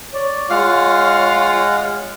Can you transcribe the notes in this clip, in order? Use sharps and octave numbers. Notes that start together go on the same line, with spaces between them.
C#5 D5
G#3 F4 F5 F#5